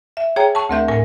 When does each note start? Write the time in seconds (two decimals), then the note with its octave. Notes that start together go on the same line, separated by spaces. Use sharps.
0.17 E5
0.36 G#4 C#5 G5 G#5 A#5
0.55 A5 C#6
0.69 D2 A3 C4 A#4 E5 G6
0.88 A2 A#4 G#5